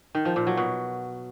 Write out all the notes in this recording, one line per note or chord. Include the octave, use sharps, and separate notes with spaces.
D#3
F3
A#2
F#3
B2